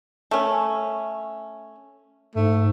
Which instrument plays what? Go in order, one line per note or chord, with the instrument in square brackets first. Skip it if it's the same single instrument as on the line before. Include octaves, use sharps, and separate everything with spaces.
[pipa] A3 C#4
[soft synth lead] G#2 [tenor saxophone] A3